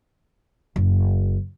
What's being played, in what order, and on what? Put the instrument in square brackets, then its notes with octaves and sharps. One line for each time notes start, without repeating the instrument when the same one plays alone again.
[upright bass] F#1